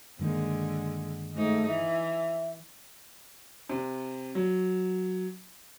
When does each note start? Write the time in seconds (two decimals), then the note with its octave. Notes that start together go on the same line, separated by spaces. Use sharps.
0.19 G2 D3 D#3 G#3 A#3
1.33 G#2 A3 D#4
1.67 E3 E5
3.69 C3
4.35 F#3